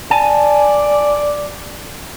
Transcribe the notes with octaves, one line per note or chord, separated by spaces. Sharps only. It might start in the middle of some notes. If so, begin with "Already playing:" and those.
D5 G#5 A5